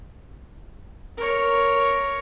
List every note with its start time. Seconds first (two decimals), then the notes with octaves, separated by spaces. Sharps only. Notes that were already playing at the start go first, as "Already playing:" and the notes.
1.17 A#4 C#5